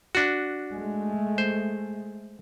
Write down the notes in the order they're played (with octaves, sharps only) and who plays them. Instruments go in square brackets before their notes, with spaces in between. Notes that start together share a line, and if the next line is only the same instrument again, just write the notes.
[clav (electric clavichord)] D4 F#4
[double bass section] G#3 A3
[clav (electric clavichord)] C5